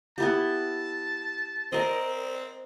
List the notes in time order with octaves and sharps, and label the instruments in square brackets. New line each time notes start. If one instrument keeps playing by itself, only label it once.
[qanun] B3 E4 G4 [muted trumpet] A5
[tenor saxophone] C4 [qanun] A#4 D#5